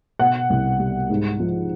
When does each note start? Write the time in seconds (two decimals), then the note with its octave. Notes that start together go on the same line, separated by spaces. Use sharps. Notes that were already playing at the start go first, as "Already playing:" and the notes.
0.19 B2 F#5
0.50 C2
0.80 G3
1.10 G#2
1.40 F3